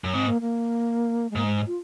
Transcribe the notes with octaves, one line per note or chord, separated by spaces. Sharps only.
F#2
G#2 C4
A#3
A#3
G#3
G#2 A#3
G#3
F4